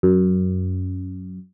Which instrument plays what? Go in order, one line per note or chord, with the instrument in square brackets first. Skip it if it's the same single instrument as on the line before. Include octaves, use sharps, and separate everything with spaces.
[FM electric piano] F#2